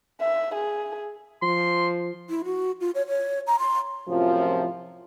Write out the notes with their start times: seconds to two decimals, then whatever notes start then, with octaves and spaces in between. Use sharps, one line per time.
0.20 E5
0.54 G#4
1.42 F3 C6
2.29 E4
2.45 F#4
2.81 F4
2.95 C#5
3.07 C#5
3.47 A#5
3.59 C6
4.08 F#2 A2 C3 F3